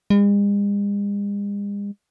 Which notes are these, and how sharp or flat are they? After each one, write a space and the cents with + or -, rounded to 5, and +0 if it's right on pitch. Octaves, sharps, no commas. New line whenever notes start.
G#3 -45